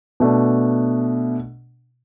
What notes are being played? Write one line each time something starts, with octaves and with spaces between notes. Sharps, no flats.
B2 A3 D4